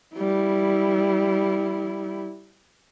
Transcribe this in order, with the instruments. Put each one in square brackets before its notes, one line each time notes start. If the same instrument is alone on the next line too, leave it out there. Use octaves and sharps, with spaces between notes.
[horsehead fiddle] G3 E4